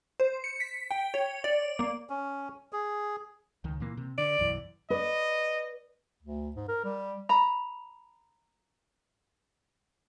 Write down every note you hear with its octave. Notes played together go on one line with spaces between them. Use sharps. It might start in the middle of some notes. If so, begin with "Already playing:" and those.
C5
C#7
B6
G5
C#5
D5
A#3
C#4
G#4
C#2 D#3
A#2 E3 A#3
C3
D3 D5
B1 F#2 E3
B4 D5 D#5
D2
G#2
A#4
G3
A#5 B5